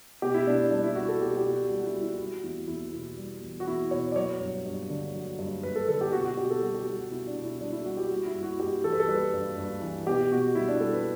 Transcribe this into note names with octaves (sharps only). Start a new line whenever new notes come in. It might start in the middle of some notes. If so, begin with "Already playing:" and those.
B2 G4
E4
B2 D4
D4
G3 D4
E4
G3 F#4
A4
B2 G4
G4
B2
F#4
G3
F#4
E4
G3
E4
E4
G3 F#4
E2 E4
E2 E4
B2 E4
G3
E2
F#4
E2 E4
B2 C#5
D5
F#3 C#5
G2
G2
D3
F#3
G2
G2 B4
A4
D3 A4
G4
B2 F#4
F#4
B2 G4
A4
G3 F#4
G4
G3 G4
F#4
B2 E4
D4
B2
E4
G3 D4
E4
G3 F#4
G4
G3 F#4
E4
G2
F#4
G2 G4
E3 A4
B4
A4
G3 B4
G2
G2
E3
B2 G4
B2 F#4
G3 E4
D4
G3 A4
B4